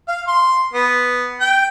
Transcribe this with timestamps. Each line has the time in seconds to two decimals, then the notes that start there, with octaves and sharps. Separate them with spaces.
0.08 F5
0.27 C6
0.73 B3
1.40 G5